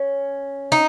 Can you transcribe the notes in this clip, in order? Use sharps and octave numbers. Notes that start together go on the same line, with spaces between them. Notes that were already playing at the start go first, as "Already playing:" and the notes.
Already playing: C#4
D#4